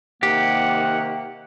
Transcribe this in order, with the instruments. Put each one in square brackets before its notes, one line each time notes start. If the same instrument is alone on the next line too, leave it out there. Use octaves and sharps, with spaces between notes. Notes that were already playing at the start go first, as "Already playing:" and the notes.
[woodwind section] C3 D#3 A#3 [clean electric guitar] G4 [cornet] F#5